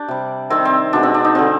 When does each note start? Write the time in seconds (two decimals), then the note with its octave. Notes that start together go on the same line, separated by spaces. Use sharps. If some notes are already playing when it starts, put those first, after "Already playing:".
Already playing: D4 G4
0.08 C3 G3
0.50 C3 D#3 G3 C4
0.65 C4
0.93 B2 G#3 D4
1.03 C4
1.14 D4
1.25 D#4
1.35 D3 G3 C4